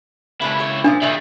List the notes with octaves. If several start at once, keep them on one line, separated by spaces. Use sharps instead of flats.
C#2 C#4 D4 E4 B4
G4 C#5
A#2 E3 F3 D4
A#2 D#3 G3 E4 G#4